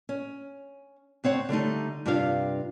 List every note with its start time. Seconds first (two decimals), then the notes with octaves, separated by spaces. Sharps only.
0.09 C#4
1.24 D2 C4 C#5 F#5
1.49 D3 G3 A3 D#4
2.06 G2 C3 D4 F4 B4 F5